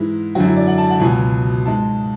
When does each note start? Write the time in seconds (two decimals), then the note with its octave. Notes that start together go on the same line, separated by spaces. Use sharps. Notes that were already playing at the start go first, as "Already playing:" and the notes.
Already playing: G#2 E3 G#3 E4
0.35 F#2 D3 F#3 F#4
0.45 E4
0.57 D5
0.67 F#5
0.78 A5
0.90 F#5
1.00 C#2 B2 F#3 G#5
1.66 G#2 G#3 A5